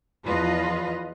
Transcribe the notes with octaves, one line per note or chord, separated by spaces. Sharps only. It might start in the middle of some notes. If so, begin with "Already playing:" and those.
E2 F3 F4 B4 D#5